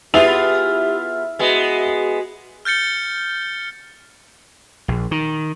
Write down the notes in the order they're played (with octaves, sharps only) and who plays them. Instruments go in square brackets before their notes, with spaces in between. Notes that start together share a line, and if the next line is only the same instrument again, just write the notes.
[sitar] B3 F4 G#4 [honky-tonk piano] E4 E5 F7 [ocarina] G4
[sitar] G#3 B3 [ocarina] F#4
[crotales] F6 G6 A6 C#7 G7
[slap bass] A#1
D#3